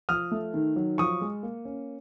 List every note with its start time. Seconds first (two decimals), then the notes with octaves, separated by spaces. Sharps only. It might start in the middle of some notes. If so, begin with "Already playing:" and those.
0.09 F3 D#6 F6
0.32 A3
0.54 D#3
0.76 F#3
0.98 F3 C#6 D#6
1.21 G#3
1.43 A#3
1.65 C#4